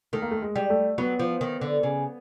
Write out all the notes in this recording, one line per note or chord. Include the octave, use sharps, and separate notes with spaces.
D#3 A3
A#3
A3
G#3
G3
A3
F#3 B3
F3
D#3
D3
C#3